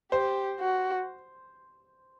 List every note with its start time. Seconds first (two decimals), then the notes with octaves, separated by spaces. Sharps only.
0.12 G4 C5
0.59 F#4